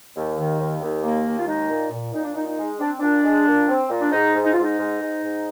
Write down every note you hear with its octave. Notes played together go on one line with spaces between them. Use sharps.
D#2
D#3
D#2
D#2
A#3
D#2
F4
G#3 D#4
A#2
A#2
A#2 D#4
D4
A#2 D#4
D#4
G#3
C4 D4
A#2 D4
G#3
A#2
C4
A#2
D4
G#2 D#4
G#2
D#4
G#2 F4
D#4
G#2
G#2
G#2